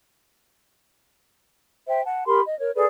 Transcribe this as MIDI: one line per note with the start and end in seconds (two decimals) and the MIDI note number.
1.87 2.01 72
1.87 2.01 76
1.87 2.01 79
2.05 2.23 78
2.05 2.23 81
2.26 2.40 67
2.26 2.40 70
2.26 2.40 83
2.26 2.40 84
2.46 2.57 75
2.60 2.71 70
2.60 2.71 73
2.76 2.86 68
2.76 2.86 69
2.76 2.86 71
2.76 2.86 74